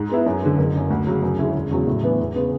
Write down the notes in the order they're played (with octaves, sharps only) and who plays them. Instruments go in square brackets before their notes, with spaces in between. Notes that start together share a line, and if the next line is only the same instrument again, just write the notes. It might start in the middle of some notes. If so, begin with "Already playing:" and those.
Already playing: [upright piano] G#2
G#3 B3 E4
F#2
D3 G#3
F#1
F#2 D3
D2
C#3 F#3
F#2
D3 G#3 C#4 E4
E1
E2 C#3 F#3
A2
E3 B3 D4
E2
C#3 G#3 B3